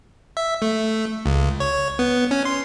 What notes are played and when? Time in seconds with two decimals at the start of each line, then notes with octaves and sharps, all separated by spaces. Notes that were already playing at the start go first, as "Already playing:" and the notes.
0.37 E5
0.62 A3
1.26 C#2
1.60 C#5
1.99 B3
2.31 C#4
2.45 C6